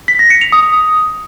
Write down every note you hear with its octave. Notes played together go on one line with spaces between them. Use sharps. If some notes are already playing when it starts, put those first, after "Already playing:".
B6
A#6
C#7
F7
D#6